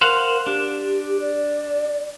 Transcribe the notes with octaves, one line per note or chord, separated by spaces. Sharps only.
A#4 C5 F5 F#5
D4 G4
D5